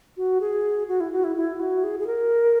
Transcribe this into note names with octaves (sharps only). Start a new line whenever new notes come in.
F#4
G#4
F#4
E4
F#4
E4
E4
F#4
G#4
G#4
A#4